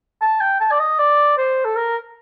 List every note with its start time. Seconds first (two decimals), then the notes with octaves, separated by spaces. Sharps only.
0.22 A5
0.41 G5
0.60 A5
0.71 D5
0.79 D#5
0.99 D5
1.38 C5
1.64 A4
1.76 A#4